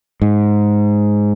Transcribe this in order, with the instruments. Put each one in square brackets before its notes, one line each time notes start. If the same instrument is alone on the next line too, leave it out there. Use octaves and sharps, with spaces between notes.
[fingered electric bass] G#2